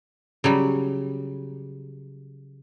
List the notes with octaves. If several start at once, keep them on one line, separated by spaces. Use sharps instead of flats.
C#3 F#3 G3